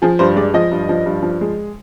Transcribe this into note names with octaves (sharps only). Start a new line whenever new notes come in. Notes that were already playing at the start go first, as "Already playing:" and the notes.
F3 G#4
G2 C5
G#3 D5
F3 D#5
G2
F3
G2
F3
G#3